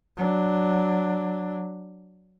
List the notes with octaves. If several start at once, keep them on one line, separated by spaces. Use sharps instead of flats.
F#3 D4